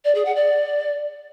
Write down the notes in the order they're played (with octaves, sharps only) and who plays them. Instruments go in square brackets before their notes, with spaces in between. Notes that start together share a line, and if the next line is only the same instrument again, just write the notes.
[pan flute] D5
G#4
F#5
D5